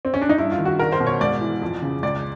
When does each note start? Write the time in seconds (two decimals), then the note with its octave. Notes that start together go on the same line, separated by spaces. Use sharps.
0.05 C4
0.14 C#4
0.22 D4
0.29 D#4
0.38 G2 E4
0.52 F4
0.58 D#3
0.65 F#4
0.79 C2 A#4
0.92 C5
1.00 B2
1.07 C#5
1.21 G#2 D5
1.41 E3
1.62 F2
1.82 C#3
2.03 C#2 D5